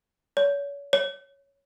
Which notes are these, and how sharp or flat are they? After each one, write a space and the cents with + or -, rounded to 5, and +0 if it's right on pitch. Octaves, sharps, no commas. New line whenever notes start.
C#5 +35
C#5 +5